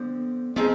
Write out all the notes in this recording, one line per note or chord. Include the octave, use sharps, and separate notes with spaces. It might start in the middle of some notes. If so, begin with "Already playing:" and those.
Already playing: D3 F3 B3 C4
F3 B3 C4 D#4 G#4